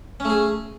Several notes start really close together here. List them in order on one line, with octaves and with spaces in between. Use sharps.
C#4 A3 G#4